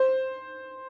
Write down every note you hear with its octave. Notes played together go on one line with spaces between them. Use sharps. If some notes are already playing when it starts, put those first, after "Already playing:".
Already playing: C5